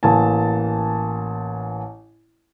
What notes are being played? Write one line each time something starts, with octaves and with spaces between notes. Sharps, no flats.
A1 A#3 G#5 A5